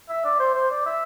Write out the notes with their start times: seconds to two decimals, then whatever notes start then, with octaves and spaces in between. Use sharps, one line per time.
0.09 E5
0.25 D5
0.40 C5
0.55 C5
0.71 D5
0.86 E5